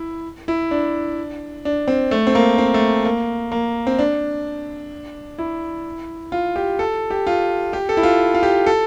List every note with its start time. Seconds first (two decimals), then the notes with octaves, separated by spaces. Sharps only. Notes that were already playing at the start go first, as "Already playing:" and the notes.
Already playing: E4
0.48 E4
0.71 D4
1.65 D4
1.88 C4
2.11 A3
2.27 C4
2.35 A#3
2.58 C4
2.74 A3
3.05 A#3
3.52 A#3
3.87 C4
3.99 D4
5.38 E4
6.32 F4
6.56 G4
6.79 A4
7.10 G4
7.27 F4
7.73 G4
7.89 A4
7.97 E4
8.03 F4
8.35 F4
8.43 G4
8.66 A4